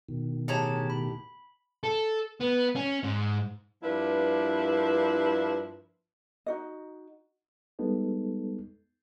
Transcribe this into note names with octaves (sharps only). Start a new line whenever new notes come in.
B2 D#3
A2 G4 G#4 C#5 A5 A#5
B5
A4
B3
C#4
G#2
G2 F3 A#3 D4 E4 B4
D#4 F#4 D#5
G3 G#3 B3 D#4 A4